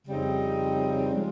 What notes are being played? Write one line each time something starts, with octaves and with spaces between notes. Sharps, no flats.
F2 C#3 G3 C4 D#4
F3 G#3